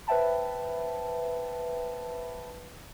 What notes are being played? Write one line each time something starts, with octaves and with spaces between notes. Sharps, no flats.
B4 C5 E5 G5 A5 B5